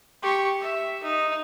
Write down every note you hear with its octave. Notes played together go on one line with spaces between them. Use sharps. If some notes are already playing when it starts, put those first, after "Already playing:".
G4 C#6
E5
D#4